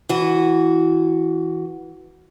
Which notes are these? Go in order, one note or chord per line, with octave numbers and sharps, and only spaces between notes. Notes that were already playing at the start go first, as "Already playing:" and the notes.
E3 F#4